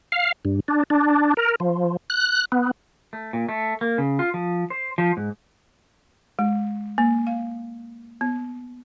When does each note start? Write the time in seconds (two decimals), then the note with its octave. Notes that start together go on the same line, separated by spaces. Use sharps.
0.12 F5
0.45 G2
0.68 D4
0.90 D4
1.37 A#4
1.60 F3
2.10 F#6
2.52 B3
3.13 A3
3.33 A#2
3.49 A3
3.81 A#3
3.98 C#3
4.19 F4
4.34 F3
4.70 C5
4.98 F3
5.17 G#2
6.39 G#3
6.98 A#3
7.27 F5
8.21 B3